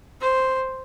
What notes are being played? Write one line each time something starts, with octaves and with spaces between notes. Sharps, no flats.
C5